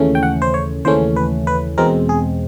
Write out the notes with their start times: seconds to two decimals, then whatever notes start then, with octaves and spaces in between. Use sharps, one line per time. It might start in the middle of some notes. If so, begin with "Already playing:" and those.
Already playing: D#2 C#3 E3 A3 C#4
0.15 G5
0.23 F#5
0.42 C5
0.54 C#5
0.85 D#2 C#3 E3 A3 C#4 C5
1.16 B4
1.47 B4
1.78 E2 B2 G#3 C4 A#4
2.09 G#4